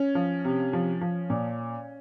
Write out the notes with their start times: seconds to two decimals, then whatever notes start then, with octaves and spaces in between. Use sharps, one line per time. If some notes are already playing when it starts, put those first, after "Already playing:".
Already playing: C#4
0.15 F3
0.45 C3
0.73 F3
1.01 F3
1.30 A#2